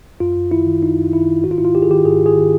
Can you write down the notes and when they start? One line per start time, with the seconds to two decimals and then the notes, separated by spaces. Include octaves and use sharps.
0.20 F#2 F4
0.37 F#2
0.51 D#3 E4
0.66 D#3
0.82 F#2 D#4
0.98 F#2
1.13 D#3 E4
1.29 D#3
1.44 G#2 F#4
1.51 F4
1.58 G#2 E4
1.65 F4
1.75 D#3 G4
1.82 G#4
1.90 D#3 G4
2.05 G#2 G#4
2.21 G#2
2.26 G#4
2.36 D#3